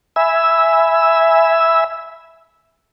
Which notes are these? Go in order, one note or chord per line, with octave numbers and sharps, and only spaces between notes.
E5 G#5 B5 E6